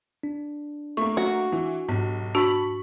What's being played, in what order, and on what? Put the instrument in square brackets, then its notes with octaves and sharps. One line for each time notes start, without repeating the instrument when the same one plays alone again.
[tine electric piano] D4
[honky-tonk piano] A3 A#3 [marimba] C#6
[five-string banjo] F#4
[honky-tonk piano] E3
[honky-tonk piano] B1 [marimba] G#2
[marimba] D4 F#4 [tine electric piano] A5 B5 [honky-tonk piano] C#6 B6 F#7